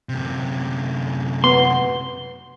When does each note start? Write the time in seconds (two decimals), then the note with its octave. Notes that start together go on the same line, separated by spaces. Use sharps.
0.09 F#2 C3
1.44 B3 C6